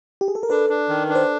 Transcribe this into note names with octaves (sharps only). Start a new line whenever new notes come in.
G4
G#4
A4
A#4
D4 A4 B4
D4
D#3
D4
C5